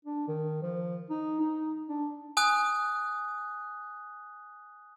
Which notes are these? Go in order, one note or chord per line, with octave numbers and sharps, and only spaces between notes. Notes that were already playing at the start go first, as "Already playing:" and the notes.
D4
D#3
F3
D#4
D#4
D4
G#5 D#6 F#6